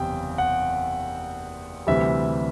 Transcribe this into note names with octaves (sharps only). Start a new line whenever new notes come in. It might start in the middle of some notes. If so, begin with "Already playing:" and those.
Already playing: F#1 E2 C3 G3 G5
F#5
D2 C3 E3 G3 E5